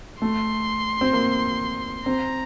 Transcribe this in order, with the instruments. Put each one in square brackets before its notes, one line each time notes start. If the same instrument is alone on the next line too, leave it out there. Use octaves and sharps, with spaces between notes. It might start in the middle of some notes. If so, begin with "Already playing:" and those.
[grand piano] A3 [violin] C6
[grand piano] C4
A#3
[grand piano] C4 [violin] A#5